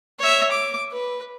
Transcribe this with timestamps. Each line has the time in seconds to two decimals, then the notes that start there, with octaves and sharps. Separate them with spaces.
0.19 C#5 E5
0.52 D6
0.92 B4